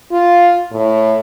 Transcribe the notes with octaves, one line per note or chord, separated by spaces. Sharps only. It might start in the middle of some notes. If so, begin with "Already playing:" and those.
F4
A2